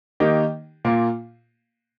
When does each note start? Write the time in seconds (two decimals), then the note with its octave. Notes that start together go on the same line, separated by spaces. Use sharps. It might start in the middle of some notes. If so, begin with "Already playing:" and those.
0.20 D#3 A#3 D#4 G4
0.85 A#2 A#3 F4